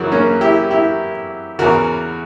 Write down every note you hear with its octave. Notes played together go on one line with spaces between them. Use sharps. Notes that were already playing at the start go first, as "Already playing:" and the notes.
Already playing: F#2 C#3 E3 F#4 A#4
A#3 C#4
E4 G4
E4 G4
E2 C#3 E3 F#4 A#4